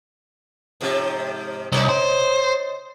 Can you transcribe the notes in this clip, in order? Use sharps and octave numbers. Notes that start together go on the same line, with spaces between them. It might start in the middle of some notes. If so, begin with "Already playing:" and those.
G#2 C3 F3
C2 D#4 C#5 D5
C5